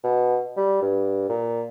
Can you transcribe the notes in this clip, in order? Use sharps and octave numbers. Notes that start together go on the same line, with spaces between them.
B2
G3
G2
A#2